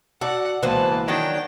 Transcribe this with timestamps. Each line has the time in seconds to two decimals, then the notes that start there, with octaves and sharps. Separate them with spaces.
0.21 F#4 D5 F#5 A5 E6
0.63 C#2 B2 E3 A#3 B4 C5 A5
1.08 D#3 F#3 D4 D#4 G5